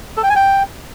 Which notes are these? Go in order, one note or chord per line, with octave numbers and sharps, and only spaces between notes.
A4
G5
G#5
G5